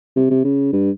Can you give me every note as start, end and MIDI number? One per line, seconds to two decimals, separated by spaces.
0.16 0.26 48
0.30 0.44 48
0.45 0.72 49
0.73 0.91 43